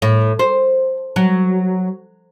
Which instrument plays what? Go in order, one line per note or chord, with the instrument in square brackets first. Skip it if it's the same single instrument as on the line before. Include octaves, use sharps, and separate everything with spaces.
[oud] A2
C5
F#3